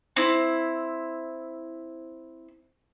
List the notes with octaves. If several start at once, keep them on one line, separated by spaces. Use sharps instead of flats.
C4 E4